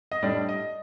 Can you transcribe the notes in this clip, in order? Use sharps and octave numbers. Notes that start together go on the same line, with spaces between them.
D#5
A2 G3 D4 D5
D#5